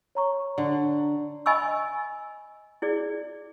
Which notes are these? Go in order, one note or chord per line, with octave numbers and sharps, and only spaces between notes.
C#5 A#5 C#6
D3
D#5 G#5 B5 C#6 E6
E4 G#4 D5